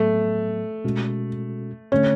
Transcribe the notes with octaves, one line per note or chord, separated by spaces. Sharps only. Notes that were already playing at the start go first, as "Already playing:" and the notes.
Already playing: A2 F#3 A3 B3
B2 G#3 C#4 F#4 A4
D3 A3 C#4